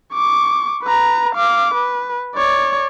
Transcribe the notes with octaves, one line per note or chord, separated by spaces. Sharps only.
C#6 D6
B4 A#5
F5 D6
B4
C#5 D5